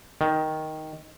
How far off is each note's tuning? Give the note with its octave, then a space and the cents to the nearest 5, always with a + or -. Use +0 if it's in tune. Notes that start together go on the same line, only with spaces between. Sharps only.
D#3 +5